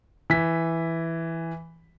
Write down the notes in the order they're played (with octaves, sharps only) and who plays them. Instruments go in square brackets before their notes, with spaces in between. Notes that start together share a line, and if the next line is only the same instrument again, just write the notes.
[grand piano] E3 B6